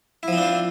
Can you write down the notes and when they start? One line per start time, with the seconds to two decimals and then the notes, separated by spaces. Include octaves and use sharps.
0.23 E4
0.28 F3
0.33 C4
0.38 D4
0.42 F4